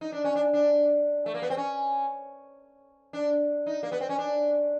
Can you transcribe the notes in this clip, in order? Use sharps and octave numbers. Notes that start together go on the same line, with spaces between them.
D#4
D4
C#4
D4
D4
A3
A#3
B3
C4
C#4
D4
D#4
A#3
B3
C4
C#4
D4